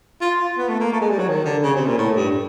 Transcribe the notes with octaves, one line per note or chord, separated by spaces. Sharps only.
F4
F4
B3
A3
A#3
A3
G#3
G3
F#3
D#3
D3
C#3
C3
A#2
A2
G2